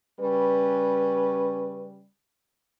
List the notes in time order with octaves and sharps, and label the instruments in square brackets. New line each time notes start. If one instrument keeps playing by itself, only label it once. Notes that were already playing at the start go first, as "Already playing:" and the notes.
[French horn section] C#3 G3 C#4 B4